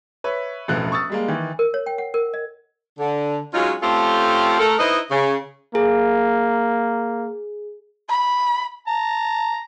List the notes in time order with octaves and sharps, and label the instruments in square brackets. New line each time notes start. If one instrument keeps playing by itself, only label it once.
[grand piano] B4 C#5 E5
E1 A1 A2 F3 F#6
C#6 D#6 E6 A6
G3 G#3 A#3
D#3 E3
[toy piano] A#4
C#5
G5
F#5
A#4
D#5
[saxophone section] D3
F#3 G#3 C#4 D#4 F4
A3 C4 C#4 F4 G4 A4
A3 A4 A#4
D#4 E4 B4 C5 D#5
C#3
[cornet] A#3 [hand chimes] G#4
[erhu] B5
[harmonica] A5 A#5